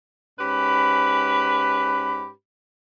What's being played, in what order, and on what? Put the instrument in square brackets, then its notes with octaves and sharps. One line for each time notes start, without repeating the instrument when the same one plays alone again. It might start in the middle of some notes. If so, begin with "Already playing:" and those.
[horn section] G#2 C#4 G4 B4 B5